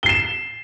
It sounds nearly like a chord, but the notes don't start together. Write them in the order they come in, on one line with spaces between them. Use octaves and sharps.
G7 C7 E7